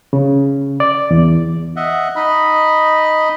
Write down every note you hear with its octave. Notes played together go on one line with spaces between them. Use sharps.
C#3
D5
E2
D#5 E5 F#5
D#4 D#5 B5